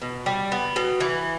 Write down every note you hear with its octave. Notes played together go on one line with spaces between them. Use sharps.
B2
G3
B3
B2
E3